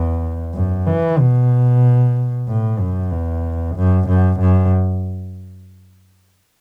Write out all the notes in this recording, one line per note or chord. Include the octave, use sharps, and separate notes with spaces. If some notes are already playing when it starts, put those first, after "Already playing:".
Already playing: E2
F#2
E3
B2
A2
F#2
E2
F#2
F#2
F#2